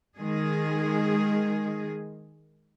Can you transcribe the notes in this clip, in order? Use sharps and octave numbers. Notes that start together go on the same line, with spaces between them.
D#3 G#3 G#4